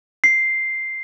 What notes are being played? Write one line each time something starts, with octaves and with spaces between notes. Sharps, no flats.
C7